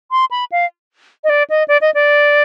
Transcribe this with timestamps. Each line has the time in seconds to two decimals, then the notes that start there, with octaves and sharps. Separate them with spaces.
0.11 C6
0.31 B5
0.52 F5
1.24 D#5
1.29 D5
1.50 D#5
1.68 D5
1.81 D#5
1.94 D5